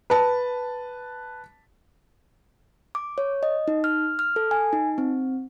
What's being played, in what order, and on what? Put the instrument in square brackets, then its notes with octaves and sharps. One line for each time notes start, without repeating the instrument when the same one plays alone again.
[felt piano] B4 A5
[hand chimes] D6
C#5
D#5
D#4
F6
F6
A4
G#5
D#4
C4